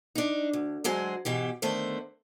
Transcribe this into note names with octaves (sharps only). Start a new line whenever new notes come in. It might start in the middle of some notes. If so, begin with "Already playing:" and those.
D4 D#4
D2
D2 F#3 G#3 G#4 C5
G#2 B2 E3 G4
D3 D#3 A3 B3 C5